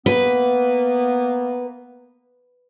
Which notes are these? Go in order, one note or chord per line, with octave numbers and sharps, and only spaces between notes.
A#3 B3 B4